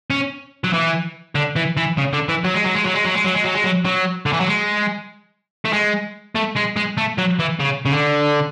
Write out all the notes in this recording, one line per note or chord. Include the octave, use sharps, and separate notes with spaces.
C#4
F#3
E3
D3
E3
E3
C#3
D3
E3
F#3
G#3
F#3
G#3
F#3
G#3
F#3
G#3
F#3
G#3
F#3
G#3
F#3
F#3
D3
E3
F#3
G#3
A3
G#3
A3
G#3
G#3
A3
F#3
E3
C#3
C#3
D3